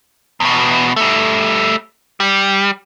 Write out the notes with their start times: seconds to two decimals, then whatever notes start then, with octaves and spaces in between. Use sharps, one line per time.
0.40 E2 B2
0.96 G3 A3
2.20 G3